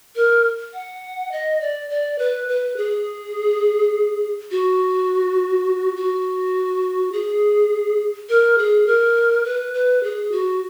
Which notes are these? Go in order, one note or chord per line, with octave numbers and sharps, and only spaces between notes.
A#4
F#5
D#5
D5
D5
B4
B4
G#4
F#4
F#4
G#4
A#4
G#4
A#4
B4
B4
G#4
F#4